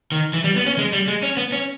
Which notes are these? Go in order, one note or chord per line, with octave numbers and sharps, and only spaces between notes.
D#3
E3
G3
B3
C#4
G#3
G3
G#3
C#4
B3
C#4